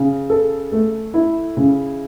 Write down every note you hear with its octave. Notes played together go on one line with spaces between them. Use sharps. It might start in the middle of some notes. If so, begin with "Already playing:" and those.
Already playing: C#3
A4
A3
E4
C#3